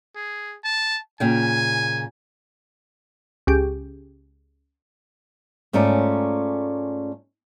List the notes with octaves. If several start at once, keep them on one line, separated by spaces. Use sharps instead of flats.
G#4
A5
A#2 C#3 G5 G#5
C#2 G4
G#2 A3 C#4 F4 D5 A#5